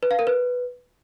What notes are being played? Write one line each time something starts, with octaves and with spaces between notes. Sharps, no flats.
B4
F5
A#4
B4